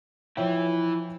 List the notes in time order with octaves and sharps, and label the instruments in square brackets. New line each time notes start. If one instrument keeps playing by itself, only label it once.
[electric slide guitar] E3 E4 [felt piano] F3 C#5 G5